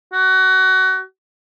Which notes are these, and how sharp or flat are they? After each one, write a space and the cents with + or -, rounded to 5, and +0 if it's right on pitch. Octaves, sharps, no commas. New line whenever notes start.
F#4 +25